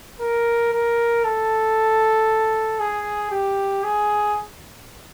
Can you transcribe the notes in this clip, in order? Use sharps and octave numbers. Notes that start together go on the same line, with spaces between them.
A#4
A#4
A4
G#4
G4
G#4